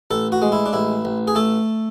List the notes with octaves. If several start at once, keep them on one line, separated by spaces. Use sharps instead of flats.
A1 A4
F#4
G#3
E4
D4
A1 E4
A1
G#4
A3 A4